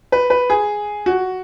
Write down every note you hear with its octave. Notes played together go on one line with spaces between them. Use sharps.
B4
B4
G#4
F#4